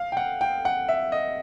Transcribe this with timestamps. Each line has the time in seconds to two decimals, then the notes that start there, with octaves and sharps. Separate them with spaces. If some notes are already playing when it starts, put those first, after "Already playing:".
Already playing: F5
0.12 G5
0.17 F#5
0.41 G5
0.65 F#5
0.89 E5
1.12 D#5